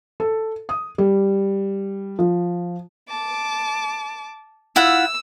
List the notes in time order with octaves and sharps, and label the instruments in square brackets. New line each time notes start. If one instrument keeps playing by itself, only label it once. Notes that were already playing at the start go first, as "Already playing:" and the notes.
[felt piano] A4
D#6
G3
F3
[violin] A5 D6
[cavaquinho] E4 F4 F#5 [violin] E6